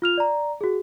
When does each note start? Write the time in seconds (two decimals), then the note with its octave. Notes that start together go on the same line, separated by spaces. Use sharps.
0.02 F4 F6 F7
0.18 D5 A#5
0.61 F#4 G#4